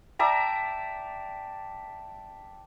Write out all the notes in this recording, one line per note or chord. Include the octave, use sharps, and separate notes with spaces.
D5 E5 G5 A5 A#5